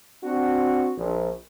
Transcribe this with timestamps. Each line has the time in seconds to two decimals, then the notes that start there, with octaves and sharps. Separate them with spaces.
0.23 C4 D4 F#4
0.97 A#1